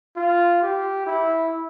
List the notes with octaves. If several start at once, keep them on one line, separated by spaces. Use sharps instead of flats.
F4
G4
E4